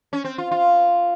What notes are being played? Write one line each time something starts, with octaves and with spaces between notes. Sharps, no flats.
C#4
C4
F4
F4